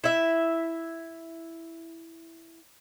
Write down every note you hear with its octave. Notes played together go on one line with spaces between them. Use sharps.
E4 E5